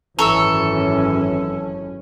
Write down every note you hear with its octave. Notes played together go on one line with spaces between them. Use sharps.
G#1 F#2 E3 C#4 A4 A#5 C#6 E6